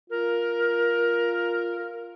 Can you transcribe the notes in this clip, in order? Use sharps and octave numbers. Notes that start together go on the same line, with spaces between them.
F4 A#4